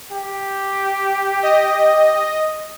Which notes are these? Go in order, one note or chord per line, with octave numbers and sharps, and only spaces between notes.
G4
D#5